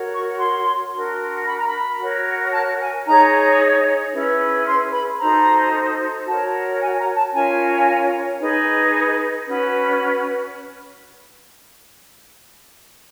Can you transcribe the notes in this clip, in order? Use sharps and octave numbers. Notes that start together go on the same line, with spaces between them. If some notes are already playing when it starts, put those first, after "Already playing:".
Already playing: F#4 A#4 C#5
C#6
C6
D4 F#4 A#4
B5
A#5
B5
F#4 A#4 C#5
A5
G#5
D#4 G#4 C#5 A#5
C#4 E4 G#4 B4
C6
B5
D#4 F#4 A4 C5 A#5
F#4 A#4 C#5 A5
G#5
A#5
A5
C#4 F4 A#4 C#5 G#5
D#4 G#4 B4
C#4 F#4 B4